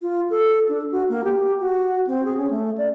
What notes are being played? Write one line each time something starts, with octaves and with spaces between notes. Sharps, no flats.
F4
A4
D4
F#4
A#3
G4
F#4
C4
G#4
C#4
A3
D5